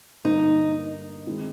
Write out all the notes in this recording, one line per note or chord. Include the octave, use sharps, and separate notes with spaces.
G2 D3 G3 A#3 D#4
D#3 G#3 C4 E4